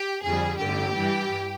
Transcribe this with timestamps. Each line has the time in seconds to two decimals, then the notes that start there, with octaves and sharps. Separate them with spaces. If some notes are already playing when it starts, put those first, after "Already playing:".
Already playing: G4
0.23 F2 D3 G3 G#4
0.59 A1 G2 D3 G4
0.96 G2 E3 G3